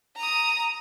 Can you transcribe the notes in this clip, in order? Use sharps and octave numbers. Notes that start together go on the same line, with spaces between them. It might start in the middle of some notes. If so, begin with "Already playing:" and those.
A#5 D#6